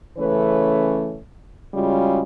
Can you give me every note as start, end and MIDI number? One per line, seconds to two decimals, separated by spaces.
0.18 1.17 49
0.18 1.17 52
0.18 1.17 57
0.18 1.17 61
0.18 1.17 71
0.18 1.17 73
1.74 2.21 49
1.74 2.21 55
1.74 2.21 56
1.74 2.21 61
1.74 2.21 65
1.74 2.21 66